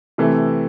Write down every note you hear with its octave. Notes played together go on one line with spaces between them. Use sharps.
C3 E3 A3